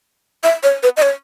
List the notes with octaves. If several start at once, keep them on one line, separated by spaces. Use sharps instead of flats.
E5
C#5
B4
D#5
C#5